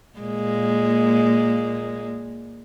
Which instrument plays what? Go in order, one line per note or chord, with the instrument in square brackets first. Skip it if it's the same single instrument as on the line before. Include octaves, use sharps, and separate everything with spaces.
[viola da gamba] A#2 G#3 A#3